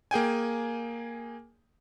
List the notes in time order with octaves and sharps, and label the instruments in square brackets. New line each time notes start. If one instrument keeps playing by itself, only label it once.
[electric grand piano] A#3 G#4 G5 G#5